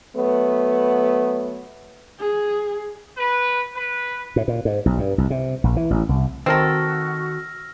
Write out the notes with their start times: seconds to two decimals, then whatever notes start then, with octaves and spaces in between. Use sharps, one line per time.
0.15 F#3 A3 B3
2.19 G#4
3.18 B4
3.75 B4
4.36 A2
4.48 A#2
4.65 G#2
4.86 B1
4.98 G2
5.18 C2
5.30 C3
5.64 A#1
5.76 E3
5.91 A1
6.09 C2
6.46 D#3 C4 F#4 A4 A#4 E6 F6 A#6